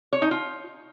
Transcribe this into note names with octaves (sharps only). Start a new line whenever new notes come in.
C#5
D#4
F4